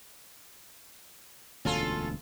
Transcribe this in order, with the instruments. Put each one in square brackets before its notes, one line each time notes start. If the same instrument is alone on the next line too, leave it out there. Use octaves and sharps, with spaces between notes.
[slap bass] E1 D2 [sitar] C#4 F4 A4